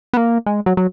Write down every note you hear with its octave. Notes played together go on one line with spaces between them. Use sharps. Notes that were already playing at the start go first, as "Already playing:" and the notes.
B3
A#3
G#3
F#3
F#3